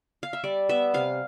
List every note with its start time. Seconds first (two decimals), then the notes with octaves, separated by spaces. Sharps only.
0.23 F5
0.33 E5
0.44 G3 D5
0.69 B3 E5
0.94 C3 F5